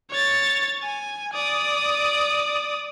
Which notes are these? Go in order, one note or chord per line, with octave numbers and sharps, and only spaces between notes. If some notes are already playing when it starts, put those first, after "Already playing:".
C#5 A6
G#5
D5 D#6